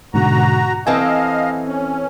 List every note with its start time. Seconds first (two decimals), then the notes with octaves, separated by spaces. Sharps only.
0.14 G#2 B2 D3 F#4 A#5
0.87 E3 C4 A4 D#5 F5 G#5
1.67 C#4